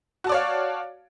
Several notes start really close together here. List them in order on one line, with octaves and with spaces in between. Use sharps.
F#4 A5 D5 C#5 F5